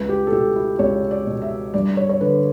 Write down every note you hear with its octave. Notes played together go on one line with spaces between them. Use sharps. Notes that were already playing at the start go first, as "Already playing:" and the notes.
Already playing: C#2 B4
G4
A4
B2 G4
E4
C#2 C#5
D5
B2
E5
G2 D5
C#5
C#5
D3 B4